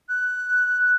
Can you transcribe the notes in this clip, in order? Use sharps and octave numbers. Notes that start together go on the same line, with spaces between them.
F#6